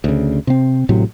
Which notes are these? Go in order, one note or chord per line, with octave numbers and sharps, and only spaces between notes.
D2 C#3
C3 C4
A1 A2 C3 F#3